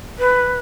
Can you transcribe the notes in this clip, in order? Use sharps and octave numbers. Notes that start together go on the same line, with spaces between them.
B4